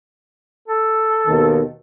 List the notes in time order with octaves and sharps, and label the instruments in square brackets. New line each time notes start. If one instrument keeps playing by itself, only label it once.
[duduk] A4
[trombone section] D#2 B2 D#3